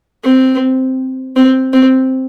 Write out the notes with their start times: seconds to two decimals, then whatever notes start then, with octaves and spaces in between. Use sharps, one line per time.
0.24 C4
1.36 C4
1.73 C4